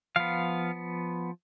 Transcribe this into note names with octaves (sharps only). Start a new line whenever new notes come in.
F3 B3 F5